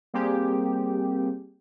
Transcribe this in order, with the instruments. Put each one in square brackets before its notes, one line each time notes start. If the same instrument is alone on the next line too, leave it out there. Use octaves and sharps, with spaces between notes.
[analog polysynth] G3 A#3 C4 G4 G#4